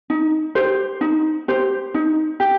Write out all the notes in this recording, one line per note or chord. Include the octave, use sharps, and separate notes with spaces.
D#4
G4 C5
D#4
G4 C5
D#4
G4